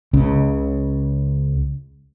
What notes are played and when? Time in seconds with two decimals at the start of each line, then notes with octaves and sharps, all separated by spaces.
0.13 C#2 C#3